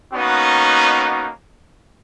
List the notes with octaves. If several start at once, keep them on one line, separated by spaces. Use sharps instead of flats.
A#3 B3 C#4 D#4 F#4